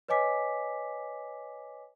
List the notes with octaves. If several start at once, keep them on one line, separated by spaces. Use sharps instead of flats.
B4 C#5 D#5 G#5 D6 B6